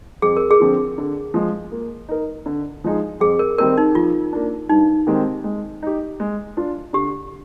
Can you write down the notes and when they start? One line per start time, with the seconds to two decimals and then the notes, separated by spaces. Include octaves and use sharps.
0.22 F2 G#4
0.37 A#4
0.51 G#4
0.60 D3 F3 C4 F4
0.98 D3
1.34 F3 G#3
1.72 A#3
2.09 D#4 A#4
2.46 D3
2.84 F3 G#3 D#4 G#4
3.20 F2 G#4
3.39 A#4
3.58 D#3 G3 C4 D#4 A#4
3.78 D#4
3.95 F3 F4
4.33 A#3 D4
4.70 G2 D#4
5.07 D#3 G#3 C4 G4
5.44 G#3
5.83 D#4 G4
6.20 G#3
6.57 D4 F4
6.93 D3 G4